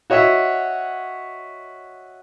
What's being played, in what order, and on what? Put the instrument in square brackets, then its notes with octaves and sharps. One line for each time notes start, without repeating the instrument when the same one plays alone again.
[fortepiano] F#4 C#5 D#5 E5 F#5